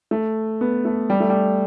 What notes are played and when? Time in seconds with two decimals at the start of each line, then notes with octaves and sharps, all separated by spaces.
0.11 A3
0.61 B3
0.85 A3
1.10 G3
1.20 A3
1.30 G3